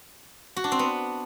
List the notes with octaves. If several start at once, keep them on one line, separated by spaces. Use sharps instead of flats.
F#4
D4
C4
B3